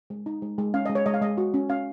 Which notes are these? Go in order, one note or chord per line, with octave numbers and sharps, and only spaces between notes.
G#3
D#4
G#3
G#3
C#4 F5
G#3 D#5
C#5
G#3 D#5
F5
G#3 D#5
F#4
C#4
C#4 F5